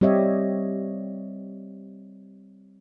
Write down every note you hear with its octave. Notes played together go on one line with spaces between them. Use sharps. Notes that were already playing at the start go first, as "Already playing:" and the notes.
G3 C4 G4 C#5 D#5 E5